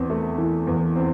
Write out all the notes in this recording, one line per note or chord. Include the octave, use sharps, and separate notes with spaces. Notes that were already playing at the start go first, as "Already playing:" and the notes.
Already playing: E2 C4
A3
E3
E2
C4